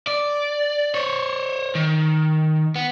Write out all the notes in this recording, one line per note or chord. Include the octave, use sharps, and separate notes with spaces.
D5
C5 C#5
D#3
B3